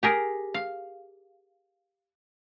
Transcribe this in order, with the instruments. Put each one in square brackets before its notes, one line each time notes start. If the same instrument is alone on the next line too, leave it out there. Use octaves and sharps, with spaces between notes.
[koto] G4 G#4 A#4
F5